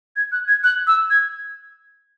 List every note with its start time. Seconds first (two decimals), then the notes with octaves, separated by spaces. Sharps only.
0.16 G#6
0.32 F#6
0.48 G#6
0.64 F#6
0.87 E6
1.10 G#6